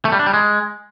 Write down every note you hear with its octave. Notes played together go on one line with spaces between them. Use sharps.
A3
G3
D4
G3
G#3